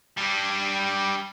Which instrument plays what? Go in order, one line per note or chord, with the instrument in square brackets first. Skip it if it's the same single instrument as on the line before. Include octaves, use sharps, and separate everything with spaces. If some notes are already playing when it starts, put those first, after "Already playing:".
[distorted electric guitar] G3 D4